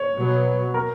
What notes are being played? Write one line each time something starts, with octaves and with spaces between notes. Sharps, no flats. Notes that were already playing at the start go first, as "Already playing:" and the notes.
Already playing: C#5
B2 F#3 B3
A#4